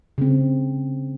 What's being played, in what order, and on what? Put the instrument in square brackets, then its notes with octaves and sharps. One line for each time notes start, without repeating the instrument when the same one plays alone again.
[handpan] C#3 C4